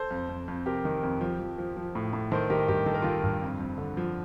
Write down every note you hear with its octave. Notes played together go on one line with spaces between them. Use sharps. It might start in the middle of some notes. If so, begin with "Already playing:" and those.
Already playing: A4 C5
F2
F2
F2
C3 G4 A#4
D#3
F2
F3
F3
F3
F3
A2
A2
D#3 A4 C5
D#3 G4 A#4
G2 G4 A#4
D#3 A4
A#4
D#3 F4 A4
G2
F2
F2
D3
F3